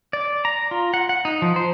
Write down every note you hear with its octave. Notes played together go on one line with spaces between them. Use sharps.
D5
A#5
F4
F#5
F#5
D#4
F3
C5